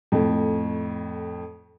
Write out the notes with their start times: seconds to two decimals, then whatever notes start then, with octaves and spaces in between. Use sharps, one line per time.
0.12 F2 A2